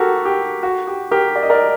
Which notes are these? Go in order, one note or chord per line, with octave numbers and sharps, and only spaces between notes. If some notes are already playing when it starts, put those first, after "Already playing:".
Already playing: F#4 G4 A4 A#4
G4
F#4
G4
G4 A#4
D5
D#5
A#4 D5